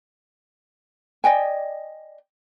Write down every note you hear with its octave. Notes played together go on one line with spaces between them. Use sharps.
D5 D#5 G5 G#5